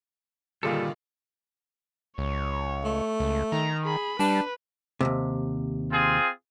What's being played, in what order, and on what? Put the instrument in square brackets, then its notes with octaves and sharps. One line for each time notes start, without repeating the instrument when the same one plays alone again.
[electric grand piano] G2 A#2 G3 [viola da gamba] D3 D#3 [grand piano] F4 G#4 [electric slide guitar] A4
[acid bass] C#2 [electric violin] C#5
[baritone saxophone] A3
[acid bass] C#2
[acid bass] D#3 [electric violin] A#5
[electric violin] G#4 B5
[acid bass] G3 [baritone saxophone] D4 [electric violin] B4
[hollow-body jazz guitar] D#2 G#2 C3
[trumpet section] C4 F4 G#4